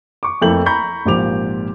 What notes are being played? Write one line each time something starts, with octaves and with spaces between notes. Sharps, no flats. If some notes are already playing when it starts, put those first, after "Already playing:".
C#6 D6
F2 A3 A#3 E4 G6 F#7
A#5 B5 C#6 G6
G#1 A#2 F3 G4 D6 F7